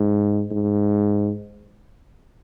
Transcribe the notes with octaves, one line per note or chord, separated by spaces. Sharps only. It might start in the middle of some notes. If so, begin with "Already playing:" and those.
Already playing: G#2
G#2